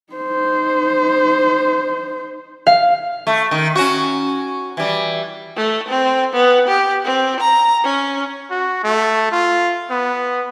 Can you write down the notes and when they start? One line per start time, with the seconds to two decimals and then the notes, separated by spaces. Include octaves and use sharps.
0.13 D#4 C5
2.67 F5
3.27 A3
3.51 D#3
3.75 C#4 F#4
4.77 E3 G3
5.56 A3
5.88 C4
6.33 B3
6.68 G4
7.05 C4
7.40 A#5
7.84 C#4
8.51 F#4
8.84 A3
9.32 F4
9.90 B3